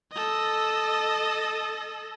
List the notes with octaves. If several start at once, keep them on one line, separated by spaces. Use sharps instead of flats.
A4 D#5